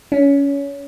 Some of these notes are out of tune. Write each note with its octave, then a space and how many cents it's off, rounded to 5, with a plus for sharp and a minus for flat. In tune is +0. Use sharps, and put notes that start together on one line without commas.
C#4 +20